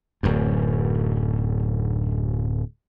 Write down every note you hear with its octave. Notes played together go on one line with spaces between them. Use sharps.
D1 F#2